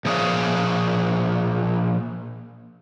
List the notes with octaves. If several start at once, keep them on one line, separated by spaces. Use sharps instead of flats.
A#2 F3 G#4 C#5 D5 F5